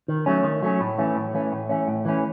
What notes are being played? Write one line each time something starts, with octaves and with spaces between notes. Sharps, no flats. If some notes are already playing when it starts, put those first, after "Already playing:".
D#3
F#3 A3 C#4
D#3
F#3 A3 C#4
A2
E3 A3 C#4
A2
E3 A3 C#4
A2
E3 A3 C#4
A2
E3 A3 C#4